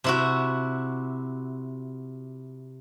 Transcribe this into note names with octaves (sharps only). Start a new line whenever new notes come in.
C3 E4 F#4